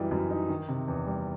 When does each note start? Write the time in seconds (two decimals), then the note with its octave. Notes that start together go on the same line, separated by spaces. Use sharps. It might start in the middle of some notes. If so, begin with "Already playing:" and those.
Already playing: F#2 E3 G3 D#4
0.11 F#2
0.30 D#4
0.49 D#3
0.68 C3
0.88 E2
1.07 G3